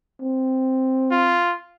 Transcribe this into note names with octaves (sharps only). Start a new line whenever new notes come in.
C4
F4